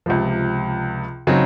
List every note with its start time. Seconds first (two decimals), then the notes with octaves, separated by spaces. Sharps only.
0.06 C#2 C3 F3
1.27 C#3 F#3 C4 D#4